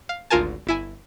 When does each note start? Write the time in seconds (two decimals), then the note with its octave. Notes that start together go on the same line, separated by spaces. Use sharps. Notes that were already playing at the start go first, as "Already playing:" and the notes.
0.09 F5
0.31 G#1 D2 F4 A#4 G#5 A5
0.67 G1 E4 G#5